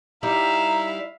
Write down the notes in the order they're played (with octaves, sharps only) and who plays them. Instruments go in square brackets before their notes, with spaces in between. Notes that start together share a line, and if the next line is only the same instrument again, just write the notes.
[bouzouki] G3 D#4 [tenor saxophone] E4 [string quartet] E5 F5 [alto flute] A#5